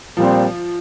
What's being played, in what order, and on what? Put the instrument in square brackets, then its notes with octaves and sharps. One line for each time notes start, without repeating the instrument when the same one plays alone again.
[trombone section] A#2 G3 C4 [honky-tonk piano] F3